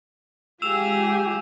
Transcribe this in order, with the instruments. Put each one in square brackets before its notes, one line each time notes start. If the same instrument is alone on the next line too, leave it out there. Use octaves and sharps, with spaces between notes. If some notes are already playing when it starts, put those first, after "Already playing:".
[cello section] G#3 [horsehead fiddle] F4 G4 [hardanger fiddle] G#4 [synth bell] E6 E7 F7